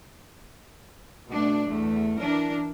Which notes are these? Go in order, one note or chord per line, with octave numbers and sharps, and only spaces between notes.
B2 A3 D4
E2 A3
E3 D4 A#4